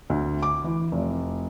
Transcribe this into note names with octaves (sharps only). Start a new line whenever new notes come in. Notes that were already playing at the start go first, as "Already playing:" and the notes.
D2
D6
E3
F1